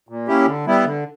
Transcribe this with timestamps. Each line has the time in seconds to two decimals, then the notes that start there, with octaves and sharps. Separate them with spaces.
0.09 A#2
0.28 A#3 C#4 E4 G4
0.47 D3
0.66 G3 B3 E4
0.85 D3